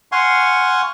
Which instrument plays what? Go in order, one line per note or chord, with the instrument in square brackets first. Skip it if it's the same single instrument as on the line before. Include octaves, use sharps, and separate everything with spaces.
[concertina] F5 F#5 G#5 C6 C#6